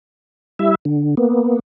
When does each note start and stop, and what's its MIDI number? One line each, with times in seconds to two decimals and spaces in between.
0.59 0.75 55
0.59 0.75 64
0.59 0.75 76
0.85 1.15 50
1.17 1.59 58
1.17 1.59 59